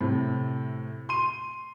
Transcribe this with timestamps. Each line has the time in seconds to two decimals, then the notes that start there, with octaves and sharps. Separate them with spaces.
0.01 A2 C3
1.09 C6 D#7